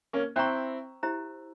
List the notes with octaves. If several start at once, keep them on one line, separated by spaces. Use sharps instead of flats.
A#3 C#4
C4 E4 C5 G5 A#5 C#6
E4 G4 C5 E5 A#5